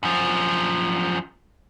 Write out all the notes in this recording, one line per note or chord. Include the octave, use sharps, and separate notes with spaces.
F#2 F3